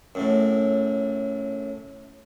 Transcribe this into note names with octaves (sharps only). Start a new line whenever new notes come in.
F#2 A2